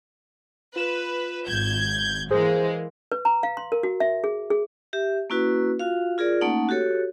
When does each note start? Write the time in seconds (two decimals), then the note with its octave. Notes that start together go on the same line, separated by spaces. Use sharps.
0.76 F4 B4 E7
1.47 G#1 G6 G#6
2.31 E3 G#3 A#3 G#4 C5
3.12 B4
3.25 A#5
3.43 F5
3.57 C6
3.72 A#4
3.83 F#4
4.00 E5
4.24 G#4
4.50 G#4
4.93 G4 E5
5.30 A#3 C#4 E4 F#4 B4
5.79 F4 F#4 F5
6.18 F4 G#4 A#4 D5
6.41 A3 A#3 C#4 D#4 F#5
6.69 F#4 G4 A4 C#5